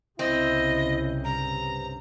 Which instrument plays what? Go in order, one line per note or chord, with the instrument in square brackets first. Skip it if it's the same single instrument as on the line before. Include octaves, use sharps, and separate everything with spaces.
[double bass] C2 C#3 [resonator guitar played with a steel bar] C4 [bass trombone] E4 [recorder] D#5
[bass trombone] G2 [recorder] A#5